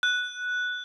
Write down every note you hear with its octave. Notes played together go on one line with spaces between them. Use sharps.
F#6